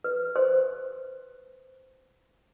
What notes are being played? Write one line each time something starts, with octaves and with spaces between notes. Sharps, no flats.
B4
C5